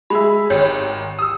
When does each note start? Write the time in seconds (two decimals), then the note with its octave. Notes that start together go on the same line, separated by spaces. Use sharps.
0.10 G#3 G#4 E5 B5
0.50 G#1 D#3 C#5
1.19 D#6 E6